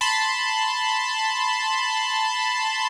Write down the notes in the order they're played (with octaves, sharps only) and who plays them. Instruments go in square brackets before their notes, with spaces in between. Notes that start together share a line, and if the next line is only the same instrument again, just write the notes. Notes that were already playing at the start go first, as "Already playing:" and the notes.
[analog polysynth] A5 B5 C6